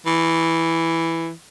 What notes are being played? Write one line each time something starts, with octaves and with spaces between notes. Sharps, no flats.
E3